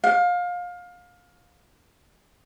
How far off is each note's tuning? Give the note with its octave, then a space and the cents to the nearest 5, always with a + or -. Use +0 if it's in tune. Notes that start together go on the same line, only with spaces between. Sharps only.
F5 +25